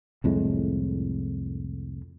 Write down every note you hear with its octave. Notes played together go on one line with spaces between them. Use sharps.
C2 F2 A2 G#3